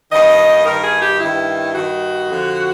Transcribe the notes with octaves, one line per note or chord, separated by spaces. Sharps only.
G2 D#3 D#5
G2 D#3 A#4
G#4
G4
G2 D#3 E4
G2 D#3 F#4
F2 D3 F3